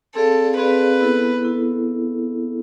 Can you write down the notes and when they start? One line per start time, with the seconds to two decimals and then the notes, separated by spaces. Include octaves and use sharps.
0.15 C4 G#4 A4 D5 F5
0.57 C4 G#4 B4 D5 F5
1.01 B3 E4 A4
1.43 B3 E4 A4